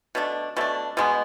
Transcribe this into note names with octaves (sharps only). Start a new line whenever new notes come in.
B2 A3 D4
B2 A3 D4
B2 G#3 B3